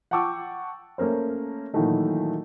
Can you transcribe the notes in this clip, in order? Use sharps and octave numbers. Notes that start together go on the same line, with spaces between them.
F#5 G5 A5 C#6 D6 E6
A3 A#3 C#4 A#4 C5
A#2 D#3 E3 F#3 A3 D#4